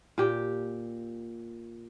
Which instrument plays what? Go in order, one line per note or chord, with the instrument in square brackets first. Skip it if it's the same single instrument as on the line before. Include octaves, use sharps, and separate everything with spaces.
[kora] A#2 G4